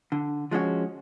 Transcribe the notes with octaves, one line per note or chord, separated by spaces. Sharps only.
D3
F3 G#3 C#4 F#4